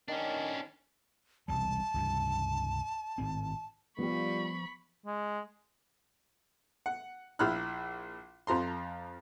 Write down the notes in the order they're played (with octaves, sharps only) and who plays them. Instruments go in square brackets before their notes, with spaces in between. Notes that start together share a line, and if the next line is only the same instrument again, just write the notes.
[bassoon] D#3 [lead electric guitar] C#4 D4
[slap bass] E1 C2 G3 [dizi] A5
[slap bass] C#2 G2 C3
G#1 A2 C4
[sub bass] F3 [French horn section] G3 F4 [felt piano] B3 [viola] B5 C#6
[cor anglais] G#3
[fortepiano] F#5
A#1 E4 B5 F6 F#6
F2 F3 A#5 C6